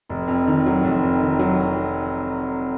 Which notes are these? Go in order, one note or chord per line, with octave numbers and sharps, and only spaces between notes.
F1
F2
D#3
F#3
F1
F2
D#3
F#3